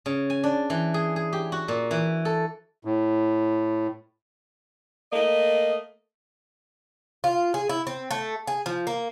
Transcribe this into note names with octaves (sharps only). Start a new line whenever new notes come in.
C#3
G#5
D4
E3
G#4
G#4
G4
F#4
A#2
E3
A4
A2
A3 A#3 D#5
F4
G#4
E4
C4
A3
G#4
F3
A#3